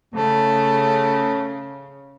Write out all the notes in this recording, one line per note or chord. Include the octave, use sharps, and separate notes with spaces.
C#3 A3